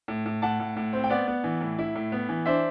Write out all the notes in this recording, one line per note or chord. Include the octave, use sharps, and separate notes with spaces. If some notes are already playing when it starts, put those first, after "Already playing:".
A2
A2
A2 F#5 A5
A2
A2
C4
G5
B3 D5 F#5
B3
E3
A2
E4
A2
B3
E3
D4 C5 E5